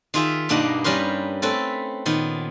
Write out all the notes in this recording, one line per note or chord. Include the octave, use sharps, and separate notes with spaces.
D#3 F4 G#4 E5
G2 B2 A#3 D4 D#4 F#5
G2 G3 C#4 A#4 B4 C6
A3 C4 C#4 A4 B4
A#2 D#3 B3